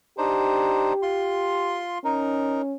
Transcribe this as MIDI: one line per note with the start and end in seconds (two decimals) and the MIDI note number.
0.18 0.93 62
0.18 0.93 63
0.18 1.83 67
0.18 0.93 72
1.02 1.98 65
1.02 1.98 84
2.04 2.77 61
2.04 2.62 63
2.04 2.62 70